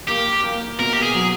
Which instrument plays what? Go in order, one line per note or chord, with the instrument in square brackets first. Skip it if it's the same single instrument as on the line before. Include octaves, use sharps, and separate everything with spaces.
[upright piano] A#3 [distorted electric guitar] G4
[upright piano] A#3
[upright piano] B2 [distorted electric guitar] A#4
[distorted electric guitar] G4
G#4
[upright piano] F#3